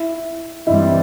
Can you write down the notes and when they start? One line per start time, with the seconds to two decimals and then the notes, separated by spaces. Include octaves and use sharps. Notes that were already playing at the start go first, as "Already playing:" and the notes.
Already playing: E4
0.67 G2 E3 G3 C4 E4